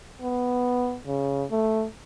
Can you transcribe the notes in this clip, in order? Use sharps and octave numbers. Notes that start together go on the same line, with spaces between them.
B3
C#3
A3